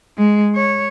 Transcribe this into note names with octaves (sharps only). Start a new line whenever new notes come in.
G#3
C#5